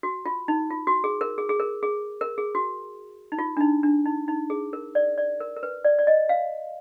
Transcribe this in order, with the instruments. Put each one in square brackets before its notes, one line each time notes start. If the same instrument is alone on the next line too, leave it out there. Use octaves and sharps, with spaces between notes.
[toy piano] F#4
F4
D#4
F4
F#4
G#4
A#4
G#4
G#4
A#4
G#4
A#4
G#4
F#4
D#4
F4
D4
D#4
D4
D#4
D#4
G#4
A#4
D5
D5
A#4
A#4
B4
D5
D5
D#5
F5